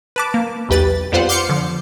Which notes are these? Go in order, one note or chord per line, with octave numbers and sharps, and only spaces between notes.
B4 A5 D6
A#3
B1 E2 G4 B4 A6
F2 G3 B3 F4 C5 F#5
C6 D6 F6 G6 C7 C#7
D3 F3